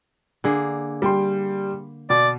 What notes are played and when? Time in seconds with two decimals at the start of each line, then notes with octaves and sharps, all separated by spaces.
0.44 D3 A#3 G#4
1.02 G3 G5 C6
2.10 B2 D5